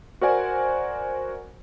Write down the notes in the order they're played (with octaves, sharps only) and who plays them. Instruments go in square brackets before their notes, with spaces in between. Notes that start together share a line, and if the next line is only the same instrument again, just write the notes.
[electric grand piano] F#4 A#4 C5 D5 F#5 G#5